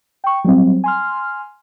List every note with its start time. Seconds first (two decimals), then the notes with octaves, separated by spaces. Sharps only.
0.24 G5 C#6
0.45 F#3 G3 C4
0.84 G#5 C6 F6